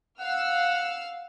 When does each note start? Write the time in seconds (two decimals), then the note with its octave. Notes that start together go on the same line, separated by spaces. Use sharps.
0.21 F5 F#5 E6 F6